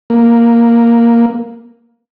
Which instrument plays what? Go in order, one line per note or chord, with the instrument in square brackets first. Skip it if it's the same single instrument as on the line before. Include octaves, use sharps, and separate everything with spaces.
[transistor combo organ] A#3